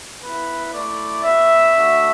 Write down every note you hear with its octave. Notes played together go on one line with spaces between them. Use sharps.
B3 E4 B4
A3 E4 D5
B3 F#4 E5
A3 D4 F#4